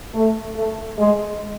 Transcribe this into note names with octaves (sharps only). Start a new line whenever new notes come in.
A3
A3
G#3